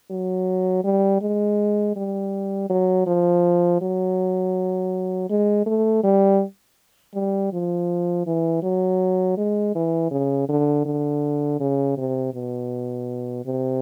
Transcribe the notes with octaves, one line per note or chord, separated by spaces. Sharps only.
F#3
G3
G#3
G3
F#3
F3
F#3
G#3
A3
G3
G3
F3
E3
F#3
G#3
E3
C#3
D3
D3
C#3
C3
B2
C3